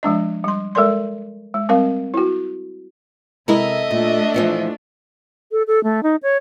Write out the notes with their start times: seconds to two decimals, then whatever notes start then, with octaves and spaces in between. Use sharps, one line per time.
0.03 F3 G#3 D4 D#5
0.44 G3 C6
0.75 G#3 A4 A#4 D5 C6
1.54 G#3
1.69 G3 C4 A#4 F5
2.14 E4 F#4
3.48 C3 G#3 E4 A4 A#4 D#5 E5
3.91 A#2 A3 D4
4.34 A#2 E3 F3
5.52 A4
5.67 A4
5.84 A3
6.03 D#4
6.23 C#5